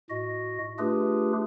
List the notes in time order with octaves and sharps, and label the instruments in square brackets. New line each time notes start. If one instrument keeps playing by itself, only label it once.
[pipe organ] A2 F#4 D#5
A3 D4 F4 G4 G#4 B4